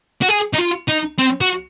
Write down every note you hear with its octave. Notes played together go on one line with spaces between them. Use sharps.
F#4
G#4
D#4
F4
D#4
C4
F#4